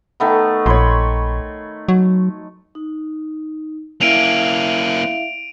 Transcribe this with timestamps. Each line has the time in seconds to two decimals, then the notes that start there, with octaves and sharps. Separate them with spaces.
0.20 D#3 A3 B3
0.66 A#1 C#5 B5 C6
1.89 F#3
2.75 D#4
4.01 A#3 C#4 E4 E5 F5 D7 D#7 F7